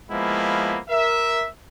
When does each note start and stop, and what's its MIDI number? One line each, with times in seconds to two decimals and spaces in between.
0.11 0.78 53
0.11 0.78 56
0.11 0.78 58
0.11 0.78 59
0.11 0.78 64
0.90 1.47 70
0.90 1.47 76